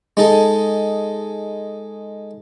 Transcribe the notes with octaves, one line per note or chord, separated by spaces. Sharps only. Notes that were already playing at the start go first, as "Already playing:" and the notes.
G#3 D#4 A4